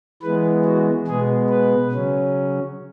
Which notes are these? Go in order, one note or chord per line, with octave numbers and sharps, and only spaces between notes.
E3 G#3 B3 B4
F#4
B2 G#3 B3 G#4
B4
C#3 F#3 C#4